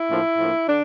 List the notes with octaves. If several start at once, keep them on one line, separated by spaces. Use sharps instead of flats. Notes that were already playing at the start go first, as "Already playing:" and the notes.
Already playing: E4
A2 F3 A#3 D4
A2 F3 A#3 D4
D3 D4